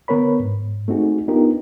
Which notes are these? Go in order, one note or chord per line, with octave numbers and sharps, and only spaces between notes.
D3 B3 A#4 C#5 B5
G#2
A3 C4 D#4 F#4 G#4
B3 D4 D#4 F4 G4 A#4